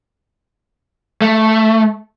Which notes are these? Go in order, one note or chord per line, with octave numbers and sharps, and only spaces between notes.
A3